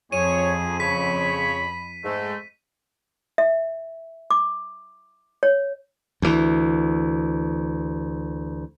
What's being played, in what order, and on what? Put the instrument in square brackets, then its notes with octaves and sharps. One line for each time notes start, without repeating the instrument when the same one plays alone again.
[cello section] F2 [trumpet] G#4 [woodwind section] C#5 [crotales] D#7
[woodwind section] C#3 C#5 [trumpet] B5 [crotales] B6
[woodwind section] G#2 G#3 A3
[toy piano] E5
D6
C#5
[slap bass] D2 E3